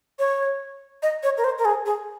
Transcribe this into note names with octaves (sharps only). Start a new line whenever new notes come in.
C#5
D#5
C#5
A#4
C5
A#4
G#4
G#4